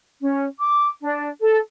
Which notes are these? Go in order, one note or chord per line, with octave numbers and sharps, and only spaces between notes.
C#4
D6
D4
A4